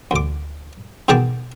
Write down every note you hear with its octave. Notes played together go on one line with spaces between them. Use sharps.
D2 D6
B2 D#3 G#4 G5 A5 D6